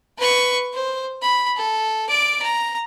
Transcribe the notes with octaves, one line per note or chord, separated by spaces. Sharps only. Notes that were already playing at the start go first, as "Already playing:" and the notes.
B4 C#6
C5
B5
A4
D5 D6
A#5